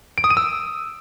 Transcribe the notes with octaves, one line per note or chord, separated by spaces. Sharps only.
D7
D#6
D#7
E6